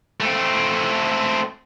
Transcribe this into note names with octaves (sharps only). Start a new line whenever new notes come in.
A3 C4